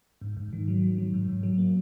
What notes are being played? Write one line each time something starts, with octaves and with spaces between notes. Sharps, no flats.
G#2
G#2
D#3
F#3
D#3
F#3
G#2
G#2
F#3
A#3